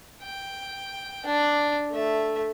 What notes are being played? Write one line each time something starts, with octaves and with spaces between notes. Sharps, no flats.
G5
D4
A3 E5